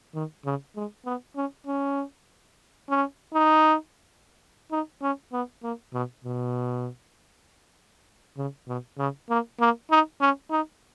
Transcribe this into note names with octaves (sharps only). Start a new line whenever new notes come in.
D#3
C#3
G#3
B3
C#4
C#4
C#4
D#4
D#4
C#4
B3
A#3
B2
B2
C#3
B2
C#3
A#3
A#3
D#4
C#4
D#4